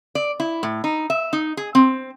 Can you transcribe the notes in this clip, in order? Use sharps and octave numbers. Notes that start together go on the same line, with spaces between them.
D5
E4
A2
D#4
E5
D#4
G#4
C4